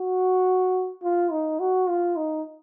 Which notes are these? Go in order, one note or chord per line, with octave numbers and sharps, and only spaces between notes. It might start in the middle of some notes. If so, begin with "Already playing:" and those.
Already playing: F#4
F4
D#4
F#4
F4
D#4